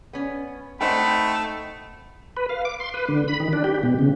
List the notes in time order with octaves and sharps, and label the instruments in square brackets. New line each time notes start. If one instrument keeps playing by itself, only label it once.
[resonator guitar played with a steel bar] B3 C#4
[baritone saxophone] A3 [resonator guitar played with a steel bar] C4 D#4 [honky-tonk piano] C5 F#5 G5 [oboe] B5
[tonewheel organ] B4
F5
D6
C6
B4
D3
B5
D#3
D4
G4
B2
C#3